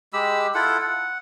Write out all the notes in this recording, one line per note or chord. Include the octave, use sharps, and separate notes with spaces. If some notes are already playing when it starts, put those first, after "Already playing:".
G#3 G4 B5 E6
E4 F4 A4 F#5
F#5